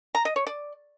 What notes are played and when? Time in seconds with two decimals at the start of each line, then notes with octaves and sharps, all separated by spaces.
0.15 A#5
0.25 D#5
0.36 C#5
0.47 D5